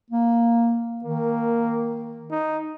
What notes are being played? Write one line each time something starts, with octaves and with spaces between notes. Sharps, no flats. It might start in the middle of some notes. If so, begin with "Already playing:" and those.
A#3
D#3 A#3
D#4